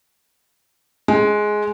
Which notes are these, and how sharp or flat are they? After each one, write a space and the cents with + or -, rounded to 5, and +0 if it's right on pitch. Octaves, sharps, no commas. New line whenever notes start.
G#3 +10